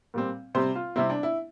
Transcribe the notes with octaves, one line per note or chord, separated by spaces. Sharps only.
A#2 G3 C4
C3 G3 C4 C5
F4
C3 G3 C4 E4
D4
E4